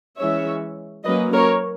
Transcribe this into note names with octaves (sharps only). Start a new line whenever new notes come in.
E3 G#3 C#4 C#5 E5
F#3 A#3 C#4 B4 D#5
A#4 C#5